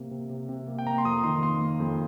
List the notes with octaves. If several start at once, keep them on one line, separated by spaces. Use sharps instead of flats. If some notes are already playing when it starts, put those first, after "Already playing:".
Already playing: C3 A#3
C3
C3
C3
A#3
G5
A#3 A#5
C6
F2 D#6
D#3 C6
A#3 C6
A#3
F2